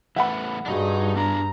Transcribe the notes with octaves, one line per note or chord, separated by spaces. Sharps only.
E3 A3 B3 E5 F#5 B5
G2 D4 D#4 F#4 G#4 D#5
B3 D4 A#5